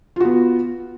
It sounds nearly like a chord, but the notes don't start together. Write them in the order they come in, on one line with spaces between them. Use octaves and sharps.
F4 F#4 B3